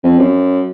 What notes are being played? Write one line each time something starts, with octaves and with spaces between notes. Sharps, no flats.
F2
F#2